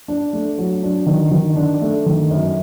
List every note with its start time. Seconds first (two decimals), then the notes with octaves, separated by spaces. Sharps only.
0.08 D4
0.33 A3
0.58 F#3
0.83 D4
1.06 D#3
1.31 D#3
1.56 D4
1.81 A3
2.06 D#3
2.31 F#2